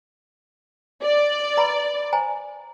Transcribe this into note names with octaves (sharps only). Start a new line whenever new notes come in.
D5
B4 A#5 B5
C5 G#5 A#5